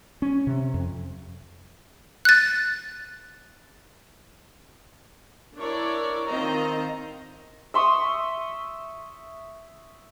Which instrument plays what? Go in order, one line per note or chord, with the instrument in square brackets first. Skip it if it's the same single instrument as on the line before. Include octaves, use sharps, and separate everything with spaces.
[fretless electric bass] C#4
C3
F2
[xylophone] F#6 A6
[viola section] D4 E4 A#4 C#5 D5
D#3 C4 F4 C5 D#5 A#5
[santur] E5 C6 C#6 D#6